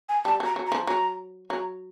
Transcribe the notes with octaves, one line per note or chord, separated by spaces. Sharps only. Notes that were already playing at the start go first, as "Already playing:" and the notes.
G#5
G3 A5
F#3
A#5
F#3
A#5
F3
F#3 A#5
F#3 A#5